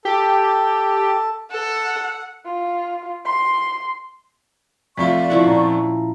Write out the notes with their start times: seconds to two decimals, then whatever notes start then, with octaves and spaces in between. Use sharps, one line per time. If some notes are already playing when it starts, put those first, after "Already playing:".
0.05 G4 A4
1.51 A4 F#5
2.45 F4
3.25 C6
4.97 F2 A3 F4 D5 C#6 B6
5.30 F3 E4 F#5
5.47 A#2 C#4 A#5